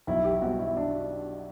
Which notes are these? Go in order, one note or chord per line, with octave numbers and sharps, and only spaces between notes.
B1 E4
G4
B2 G3 C4 F#4
E4
D4